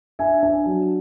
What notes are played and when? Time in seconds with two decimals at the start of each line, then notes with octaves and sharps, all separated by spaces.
0.19 D4 E5 G#5
0.43 D4
0.66 F#3